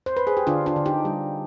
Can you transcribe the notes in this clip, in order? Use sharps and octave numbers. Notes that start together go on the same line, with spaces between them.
C5
B4
G#4
G4
D3 D4 F4
D4 F4
D3
D#4 G4
G3